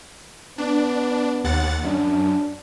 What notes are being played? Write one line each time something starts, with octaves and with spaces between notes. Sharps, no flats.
B3 D4
D#2 F#5 A6
F#2 D4